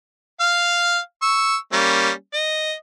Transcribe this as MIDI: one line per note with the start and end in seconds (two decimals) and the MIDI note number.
0.40 0.99 77
0.40 0.99 89
1.22 1.56 85
1.22 1.56 88
1.73 2.10 55
1.73 2.10 58
1.73 2.10 61
2.33 2.73 75